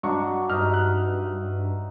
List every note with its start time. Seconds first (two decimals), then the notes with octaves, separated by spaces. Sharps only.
0.03 G2 F#3 D4 D#4 C#6
0.50 G2 D#4 D#5 E5 F6
0.74 F#6